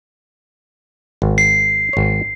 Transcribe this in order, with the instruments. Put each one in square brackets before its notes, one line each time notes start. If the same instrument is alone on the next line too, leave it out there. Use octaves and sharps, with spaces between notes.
[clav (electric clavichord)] G#1
[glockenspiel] C7
[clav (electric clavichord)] G#1 C#5